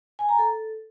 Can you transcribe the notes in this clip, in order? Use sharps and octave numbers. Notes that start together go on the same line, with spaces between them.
G#5
A#5
A4